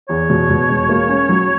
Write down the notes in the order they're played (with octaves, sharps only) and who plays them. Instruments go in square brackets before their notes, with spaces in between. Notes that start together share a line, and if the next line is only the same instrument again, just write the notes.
[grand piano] E2 [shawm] C#5
[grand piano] B2
B2
E1
A#3
C#4
F#3